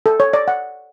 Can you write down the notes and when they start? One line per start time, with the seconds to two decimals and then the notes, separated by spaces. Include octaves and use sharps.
0.06 A4
0.20 C#5
0.33 D5
0.48 F#5